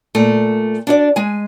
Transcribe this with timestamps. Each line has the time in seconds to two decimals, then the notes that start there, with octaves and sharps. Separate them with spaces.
0.15 A#2 A3
0.87 D4 F#4 D5
1.16 G#3 G#5